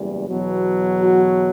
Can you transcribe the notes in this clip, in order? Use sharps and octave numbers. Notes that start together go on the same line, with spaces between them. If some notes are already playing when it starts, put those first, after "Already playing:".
Already playing: F#1 E2 G3
E2 B2 F#3
F#4